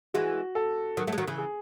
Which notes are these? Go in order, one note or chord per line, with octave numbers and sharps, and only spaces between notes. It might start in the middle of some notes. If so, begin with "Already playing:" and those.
E3 G#3 F#4
A4
D#3 F#3
F#3 A3
G#3
D#3 F#3
C#3 E3
G#4